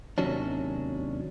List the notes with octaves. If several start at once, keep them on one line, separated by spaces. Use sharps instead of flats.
D#2 C3 D#3 F#3 C#4 D4